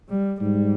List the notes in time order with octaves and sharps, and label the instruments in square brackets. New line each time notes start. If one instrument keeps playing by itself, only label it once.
[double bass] G3
[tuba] G#2 [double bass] G3